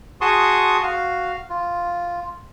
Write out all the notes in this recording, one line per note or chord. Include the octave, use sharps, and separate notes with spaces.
F#4 G#4 A5 C6 C#6 D#6
F#4 F5
F4